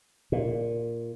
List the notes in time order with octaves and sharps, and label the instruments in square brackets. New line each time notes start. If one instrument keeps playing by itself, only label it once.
[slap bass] A#2